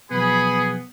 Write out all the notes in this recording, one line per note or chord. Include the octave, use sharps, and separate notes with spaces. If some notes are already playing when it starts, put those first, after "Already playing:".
B2 F3 F#3 B3 G#4 B5